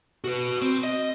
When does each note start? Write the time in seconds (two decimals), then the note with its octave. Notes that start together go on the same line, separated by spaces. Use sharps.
0.24 F#4 B4
0.62 C4
0.83 D#5